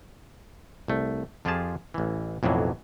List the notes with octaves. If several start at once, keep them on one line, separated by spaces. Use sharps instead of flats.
C2 A3
F2 F3 F4 G4 G#4 A5
A1 E3
B1 F2 A2 E3 F#3